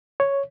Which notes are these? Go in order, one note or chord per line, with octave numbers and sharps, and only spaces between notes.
C#5